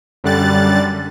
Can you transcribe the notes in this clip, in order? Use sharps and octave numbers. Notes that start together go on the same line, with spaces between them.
F#2 D3 G3 F#6 A6